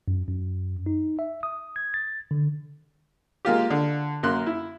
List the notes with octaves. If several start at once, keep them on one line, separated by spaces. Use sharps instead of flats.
F#2
F#2
D#4
E5
D#6
G#6
A6
D3
G#3 A#3 F4 G4
D3
F#2 A#3 C6 F#6
E4